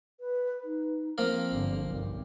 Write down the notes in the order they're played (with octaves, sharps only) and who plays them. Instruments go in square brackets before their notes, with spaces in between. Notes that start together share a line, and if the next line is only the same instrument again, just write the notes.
[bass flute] B4
D#4
[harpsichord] F3 A#3 F5 [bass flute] C4
[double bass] G1 D3
[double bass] B1 G2 [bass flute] C4